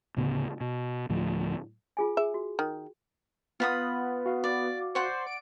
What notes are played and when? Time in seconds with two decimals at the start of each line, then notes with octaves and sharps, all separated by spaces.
0.17 D2 A2 C#3 B3
0.61 B2
1.09 D2 A2 F3
1.97 F4 G#4 G#5
2.17 G#4 E5
2.34 F#4
2.59 D#3
3.60 B3 F4 B5 D#6
4.26 F#4 F5
4.44 D5
4.95 C5 D5 F#5 C#6
5.27 D7